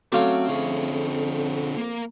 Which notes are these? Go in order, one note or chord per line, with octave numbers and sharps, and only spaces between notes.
F#3 A3 C4 C#4 C#5 F5 D6
F2 D3 G#4
A#3 A#4